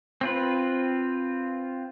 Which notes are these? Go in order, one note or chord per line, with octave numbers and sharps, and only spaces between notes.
C4 F4 B4